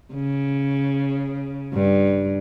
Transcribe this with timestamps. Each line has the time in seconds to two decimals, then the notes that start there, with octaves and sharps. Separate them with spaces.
0.13 C#3
1.73 G2